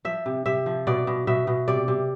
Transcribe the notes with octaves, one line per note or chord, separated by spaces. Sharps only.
F3 E5
C3
C3 E5
F3
B2 D5
B2
B2 E5
B2
C3 D5
C3